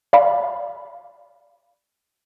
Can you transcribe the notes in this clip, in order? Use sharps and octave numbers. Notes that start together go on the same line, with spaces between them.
D5 F5 B5